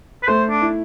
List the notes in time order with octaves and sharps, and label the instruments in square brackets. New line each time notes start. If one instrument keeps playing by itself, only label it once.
[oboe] B4
[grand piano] A3 [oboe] C5
[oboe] D4
[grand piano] E4